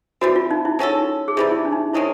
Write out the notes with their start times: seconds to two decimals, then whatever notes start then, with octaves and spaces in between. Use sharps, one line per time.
0.21 E3 G3 C4 F#4
0.36 F4
0.51 D#4
0.65 E4
0.79 G#3 C#4 D#4 F#4 A4
1.28 G#4
1.37 C3 E3 G3 G4
1.51 E4
1.58 D#4
1.65 D4
1.72 D#4
1.93 C3 D#3 G#3 C#4 E4